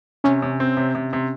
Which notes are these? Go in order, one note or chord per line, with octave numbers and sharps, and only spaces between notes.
C3 C#4
C3
C4
C3
C3
C3